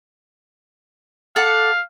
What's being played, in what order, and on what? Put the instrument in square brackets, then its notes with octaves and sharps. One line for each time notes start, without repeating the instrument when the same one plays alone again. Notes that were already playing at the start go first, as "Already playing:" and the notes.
[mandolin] A4 D5 F#5 [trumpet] F5